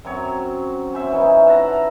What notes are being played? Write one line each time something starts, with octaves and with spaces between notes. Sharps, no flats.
F#2 F#3 C4 C#5
C#4 C5 E5
E3 C#4 D#4 E4
E5 F#5 A5 A#5